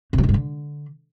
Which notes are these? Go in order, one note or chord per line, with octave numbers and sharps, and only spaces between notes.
C3
F#3
G#2
G2
D3